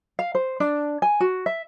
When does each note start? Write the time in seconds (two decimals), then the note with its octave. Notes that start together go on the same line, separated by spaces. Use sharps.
0.19 F5
0.35 C5
0.60 D4
1.02 G#5
1.20 F#4
1.46 E5